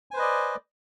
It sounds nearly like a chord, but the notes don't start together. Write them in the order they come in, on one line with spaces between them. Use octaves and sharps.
G#5 C5 B4 D#5 D5